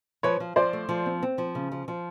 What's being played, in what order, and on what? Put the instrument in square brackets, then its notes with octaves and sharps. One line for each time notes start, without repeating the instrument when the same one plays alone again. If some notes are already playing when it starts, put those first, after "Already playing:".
[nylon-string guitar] F3 [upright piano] B4 C#5
[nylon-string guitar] F3
[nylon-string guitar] F3 [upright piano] C5 D5
[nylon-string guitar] A3
F3
C4
C4
F3
C#3
F3
F3